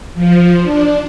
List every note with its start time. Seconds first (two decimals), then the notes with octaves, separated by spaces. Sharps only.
0.14 F3
0.63 D4